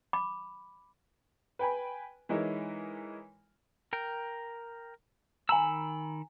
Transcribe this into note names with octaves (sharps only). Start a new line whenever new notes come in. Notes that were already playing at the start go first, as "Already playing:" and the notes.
B5 D6
B4 G5 G#5 B5
E3 G#3 D#4 E4 A#4 C#5
A#4 G5
D#3 G#5 A#5 B5 E6